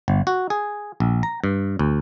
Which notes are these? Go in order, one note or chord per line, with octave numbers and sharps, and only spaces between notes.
G1
F#4
G#4
A#1
A#5
G2
D2